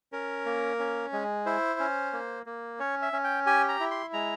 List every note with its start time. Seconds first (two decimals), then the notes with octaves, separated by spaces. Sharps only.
0.12 C#4 A#4
0.46 A#3
0.79 C#4
1.13 G#3
1.46 E4 C5
1.79 C#4
2.13 A#3
2.46 A#3
2.79 C#4 C#5
3.02 E5
3.13 C#4
3.24 G5
3.46 G4 G#5
3.69 A#5
3.80 E4
3.91 C6
4.13 G#3 A#5